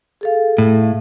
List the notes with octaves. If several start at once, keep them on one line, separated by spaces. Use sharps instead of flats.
G#4 A4 F5
A2